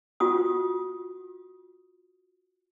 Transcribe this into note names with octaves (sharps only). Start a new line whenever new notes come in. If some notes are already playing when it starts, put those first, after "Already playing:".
F4 F#4 D#6